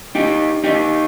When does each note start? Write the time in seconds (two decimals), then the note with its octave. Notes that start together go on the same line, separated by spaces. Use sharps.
0.15 D#4 G4
0.64 D#4 G4